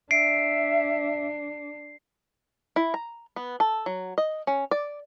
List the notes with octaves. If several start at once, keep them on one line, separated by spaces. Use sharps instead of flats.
D4 E5 C7 D7
E4
A#5
B3
A4
F#3
D#5
C#4
D5